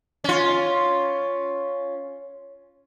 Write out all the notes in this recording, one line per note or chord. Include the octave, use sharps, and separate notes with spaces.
C#4 F4